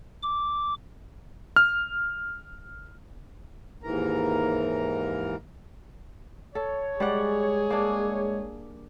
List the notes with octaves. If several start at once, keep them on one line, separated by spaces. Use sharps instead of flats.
D6
F6
D#2 G#2 E3 A#4 A#5
A4 C#5
G3 G#3 G#4 D5 F#5
A#3 D4